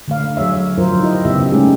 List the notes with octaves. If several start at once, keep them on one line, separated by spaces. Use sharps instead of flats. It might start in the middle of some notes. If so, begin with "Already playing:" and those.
D3 A3 F5
F#3 G#4 C#5 E5
F3 F#3 F4 A#4 C5
D#4 E4 G4 D#5
C#3 B3 G4 E5
G#3 A3 C#4 D#4 G4 G#4